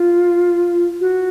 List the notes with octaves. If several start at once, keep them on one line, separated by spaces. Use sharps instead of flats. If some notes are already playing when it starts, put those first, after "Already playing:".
Already playing: F4
F#4